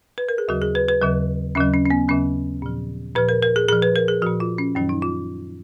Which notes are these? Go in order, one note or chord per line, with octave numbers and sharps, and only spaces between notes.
B4
A#4
G#4
D#2 C#3 F#3 F#4
G#4
B4
B4
D#2 C#3 F#3
D#2 C#3 F#3 C#4
C#4
C#4
B3
D#2 C#3 F#3 C#4
A#2 F3
A#2 F3 B4
A#4
A#4
G#4
A#2 F3 G#4
B4
A#4
G#4
A#2 F3 F#4
F4
C#4
F#2 D#3 F#3 C#4
D#4
F4